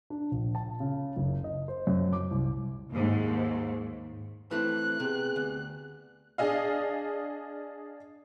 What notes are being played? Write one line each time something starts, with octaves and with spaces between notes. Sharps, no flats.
D4
A#1
A5
C#3
F#1
D#5
C5
F#2
D6
C2
D#2 G#2
E3 A3 C4 E4 B4 F#6
C3 B3 G#4
D2
D4 G#4 D#5 F5